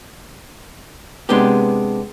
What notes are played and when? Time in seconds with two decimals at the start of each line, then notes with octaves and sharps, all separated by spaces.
1.29 C3 G#3 B3 D4 G4